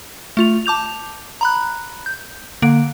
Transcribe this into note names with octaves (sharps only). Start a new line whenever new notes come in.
A3 F4 F7
A5 D6 G6 F7
A#5 B5 F#6
G6
D3 A#3 D7